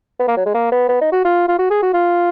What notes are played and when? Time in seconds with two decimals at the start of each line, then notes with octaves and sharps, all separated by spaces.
0.19 B3
0.28 A#3
0.37 F#3
0.46 G#3
0.54 A#3
0.72 B3
0.89 B3
1.01 D#4
1.12 F#4
1.25 F4
1.48 F4
1.59 F#4
1.70 G#4
1.82 F#4
1.94 F4